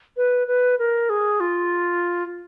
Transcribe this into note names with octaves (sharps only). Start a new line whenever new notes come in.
B4
B4
A#4
G#4
F4